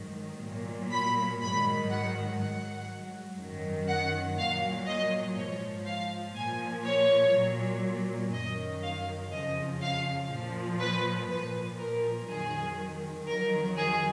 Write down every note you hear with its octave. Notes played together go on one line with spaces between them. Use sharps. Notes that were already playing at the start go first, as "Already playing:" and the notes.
Already playing: G#2 D#3 F#3
A#2 F#3
B5
G#2 D#3 F#3 B5
F#5
G#2 F#3 F#5
F#2 D#3 F#3
F#5
A#2 F#3 F5
D#5
G#2 F3 C#5
F5
A#2 F3 G#5
C#5
A#2 F#3
F#2 D#3 F#3 D#5
F5
F2 C#3 F3 D#5
F5
A#2 F3
B4
A#2 F3 B4
A#4
F2 D#3 F#3 G#4
F2 D#3 F#3 A#4
G#4